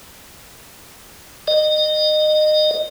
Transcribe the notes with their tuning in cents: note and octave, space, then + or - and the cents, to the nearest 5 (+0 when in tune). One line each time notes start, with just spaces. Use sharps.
D#5 -25